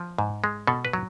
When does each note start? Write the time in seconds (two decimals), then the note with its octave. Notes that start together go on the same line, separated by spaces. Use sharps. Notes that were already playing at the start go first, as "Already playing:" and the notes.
Already playing: F3
0.18 G#2
0.44 G#3
0.67 B2 A4
0.85 B4
0.93 F#3